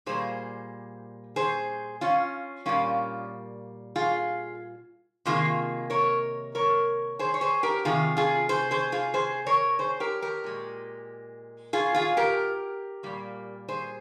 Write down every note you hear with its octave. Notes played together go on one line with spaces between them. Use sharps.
A#2 G3 A#3 G#4 C5
G#4 C5
C#4 F4
A#2 G3 A#3 C#4 F4
F4 G#4
C3 D#3 A#3 F4 G#4
A#4 C#5
A#4 C#5
G#4 C5
C#5
G#4 C5
G4 A#4
C3 D#3 F4 G#4
F4 G#4
G#4 C5
G#4 C5
F4 G#4
G#4 C5
A#4 C#5
G#4 C5
G4 A#4
G4 A#4
A#2 G#3
F4 G#4
F4 G#4
G4 A#4
A#2 G3 A#3
G#4 C5